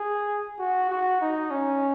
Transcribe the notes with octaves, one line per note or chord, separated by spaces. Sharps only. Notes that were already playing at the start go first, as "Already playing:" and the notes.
Already playing: G#4
F#4
F#4
D#4
C#4